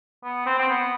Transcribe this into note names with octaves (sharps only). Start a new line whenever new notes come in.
B3
C4
C4
B3